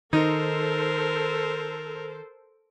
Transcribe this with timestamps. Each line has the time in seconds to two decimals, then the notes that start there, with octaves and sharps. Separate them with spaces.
0.13 D#3 D#4 A4 A#4 C5